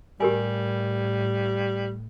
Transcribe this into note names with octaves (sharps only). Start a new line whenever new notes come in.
A2 G3 G4 A#4 G#5